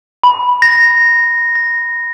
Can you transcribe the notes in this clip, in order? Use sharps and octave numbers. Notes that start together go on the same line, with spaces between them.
B5
A#6
A#6